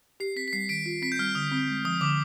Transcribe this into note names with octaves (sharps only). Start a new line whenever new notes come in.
G4 C7
C4 B6
B6
G3 C7
D#3 B6 D7
F4
C4 B6
G6
G3 F6
D3 D#6
C4
G#3
F3 D#6
D3 D6